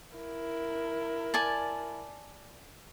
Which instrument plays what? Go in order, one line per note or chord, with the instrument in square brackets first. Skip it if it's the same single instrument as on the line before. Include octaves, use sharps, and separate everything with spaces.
[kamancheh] E4 A#4
[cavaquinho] D5 G#5 A5